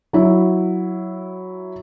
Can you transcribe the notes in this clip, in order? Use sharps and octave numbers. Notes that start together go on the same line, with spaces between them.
F#3 E4